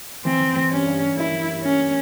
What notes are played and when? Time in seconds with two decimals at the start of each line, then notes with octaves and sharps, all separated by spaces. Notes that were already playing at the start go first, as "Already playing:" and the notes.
0.25 E3 C4
0.40 E3
0.56 E3
0.70 G2 C#4
0.86 G2
1.01 G2
1.17 A#3 E4
1.32 E3
1.48 G2
1.63 G2 C#4
1.79 A#3